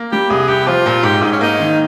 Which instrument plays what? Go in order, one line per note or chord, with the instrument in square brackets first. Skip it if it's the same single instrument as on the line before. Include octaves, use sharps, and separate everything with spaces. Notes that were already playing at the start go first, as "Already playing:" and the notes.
Already playing: [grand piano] A#3
[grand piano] G3 [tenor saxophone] G4
[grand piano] C2 [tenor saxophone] G#4
[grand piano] C2 [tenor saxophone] G4
[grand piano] F3 [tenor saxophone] F4
[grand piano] A#2
[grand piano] G#2 [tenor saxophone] G4
[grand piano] G#2 [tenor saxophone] D#4
[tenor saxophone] C#4
[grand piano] A#3 [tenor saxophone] D#4
[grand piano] D#3